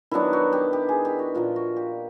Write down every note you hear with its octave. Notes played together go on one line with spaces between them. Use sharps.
D#3 F#3 B3 D4 E4
F#4
G4
G4
G#4
G4
F#4
A#2 F3 A#3 F4
F#4
G4